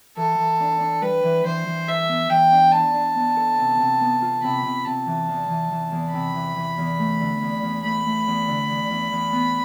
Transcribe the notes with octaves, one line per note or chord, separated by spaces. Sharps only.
E3 A4
E3
D4
D4
G3 B4
E3
E3 C5
E3
A4 E5
B3
E3 G5
D4
D4 A5
D4
B3
A4
C3
C3
B3
F4
C3 B5
C3
C3 A5
E3
E2
E3
E3
E2
C3 B5
E3
E3
E2
A3
D3
E2
E2
A3 B5
A3
E2
D3
E2
E2
E2
B3